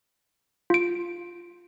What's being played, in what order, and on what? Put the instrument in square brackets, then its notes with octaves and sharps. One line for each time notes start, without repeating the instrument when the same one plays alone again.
[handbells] F4 D7